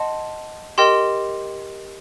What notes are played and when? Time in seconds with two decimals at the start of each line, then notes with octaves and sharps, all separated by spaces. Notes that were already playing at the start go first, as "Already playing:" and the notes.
Already playing: D#5 F#5 A5 C6
0.78 G4 A#4 D#5 G5 C6